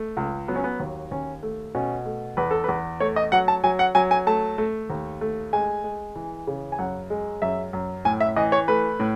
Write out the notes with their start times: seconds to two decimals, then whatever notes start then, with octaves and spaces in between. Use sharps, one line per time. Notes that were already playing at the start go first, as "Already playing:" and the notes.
Already playing: A3
0.17 C#2
0.48 F#3 B3
0.56 C#4
0.64 B3
0.80 D#2
1.11 D#2 C#4
1.43 A3
1.75 B2 C#4
2.06 A3
2.37 E2 B4
2.51 A4
2.64 E2 B4
3.00 A3 C#5
3.16 D#5
3.32 F#3 F#5
3.48 A5
3.63 F#3 G#5
3.79 F#5
3.95 F#3 G#5
4.11 G#5
4.27 A3 A5
4.58 A3
4.90 D#2
5.21 A3
5.53 G#3 G#5
5.84 G#3
6.16 E3
6.47 C#3
6.72 G#5
6.79 F#2 F#5
7.10 G#3
7.42 F#2 E5
7.73 F#2
8.05 A2 G#5
8.20 E5
8.36 E3 D#5
8.52 C#5
8.68 A3 B4
9.00 A2